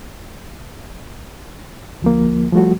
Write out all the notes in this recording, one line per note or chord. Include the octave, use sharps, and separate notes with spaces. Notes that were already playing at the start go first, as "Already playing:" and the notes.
D2 F3 A#3
F3 G3 A3 F#4